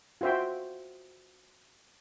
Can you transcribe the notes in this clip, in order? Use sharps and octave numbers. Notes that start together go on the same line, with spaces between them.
F4 F#4 C5 E5 G5